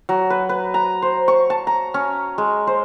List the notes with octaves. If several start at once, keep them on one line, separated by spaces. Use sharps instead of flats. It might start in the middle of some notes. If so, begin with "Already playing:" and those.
F#3
B4
B4
A#5
C5
C#6
A5
A#5
C#4
G#3
C5